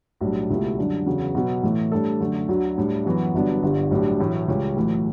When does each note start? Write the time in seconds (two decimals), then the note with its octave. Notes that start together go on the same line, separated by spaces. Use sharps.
0.21 B1 A2 G3 D4
0.50 C#2 B2 A3 E4 G4
0.77 F#2 D3 G3 D4
1.06 E2 C#3 F#3 B3 F#4
1.35 B2 F#3 B3
1.63 A2 E3 A3
1.92 A2 G3 D4 A4
2.20 F#2 D3 A3
2.48 D2 D3 F#3
2.78 A2 G3 D4
3.05 F#2 E3 B3 F#4
3.34 G1 G2 F#3 B3 D4
3.63 G1 G2 D3 G3
3.91 B1 A2 G3 D4 G4
4.19 B1 A2 E3 A3
4.48 C#2 C#3 G3 C#4 G4
4.76 B1 A2 E3 A3